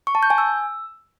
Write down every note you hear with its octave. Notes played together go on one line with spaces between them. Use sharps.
C#6
A5
G6
G#5
E6